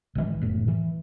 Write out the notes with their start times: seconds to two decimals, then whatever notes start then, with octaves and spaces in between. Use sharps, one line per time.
0.15 G#1 B2 E3
0.41 F#1 A2
0.68 E3